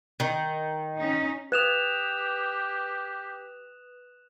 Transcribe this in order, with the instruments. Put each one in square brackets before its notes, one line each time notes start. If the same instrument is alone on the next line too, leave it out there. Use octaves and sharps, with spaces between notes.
[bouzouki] D#3
[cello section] C#4 D#4
[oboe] G4 [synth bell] B4 D#6 [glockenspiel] F#6 E7 F7